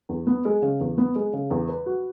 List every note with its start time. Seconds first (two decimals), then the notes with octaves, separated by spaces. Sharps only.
0.09 E2
0.27 B3
0.45 G#3
0.62 C#3
0.80 E2
0.98 B3
1.15 G#3
1.33 C#3
1.51 E2
1.69 B4
1.86 F#4